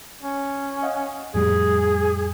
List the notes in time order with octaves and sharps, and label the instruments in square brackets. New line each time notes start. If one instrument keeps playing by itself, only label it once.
[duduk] C#4
[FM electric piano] D#5 F5 F#5
[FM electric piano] F2 A2 G3 [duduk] G#4